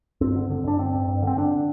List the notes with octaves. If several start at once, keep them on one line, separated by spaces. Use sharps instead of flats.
G2 C4
D3
D3
G2 D4
G2 C4
G2
G2
D3 C4
D3 D4